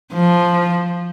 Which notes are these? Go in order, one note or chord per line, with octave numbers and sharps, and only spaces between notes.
F3